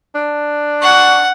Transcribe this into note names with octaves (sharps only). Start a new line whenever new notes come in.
D4
F#5 C#6